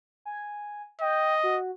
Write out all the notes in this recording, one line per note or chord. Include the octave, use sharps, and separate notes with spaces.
G#5
D#5 G5
F#4